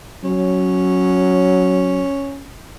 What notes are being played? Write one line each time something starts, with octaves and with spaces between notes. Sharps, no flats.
F#3 C#4